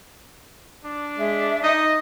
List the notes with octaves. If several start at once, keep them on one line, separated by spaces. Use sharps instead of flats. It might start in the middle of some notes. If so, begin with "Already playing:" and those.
D4
G#3 E5
D#4 D#5